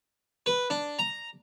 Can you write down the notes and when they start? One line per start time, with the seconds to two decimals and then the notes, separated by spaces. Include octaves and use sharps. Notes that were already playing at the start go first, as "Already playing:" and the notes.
0.46 B4
0.70 D4
0.99 A#5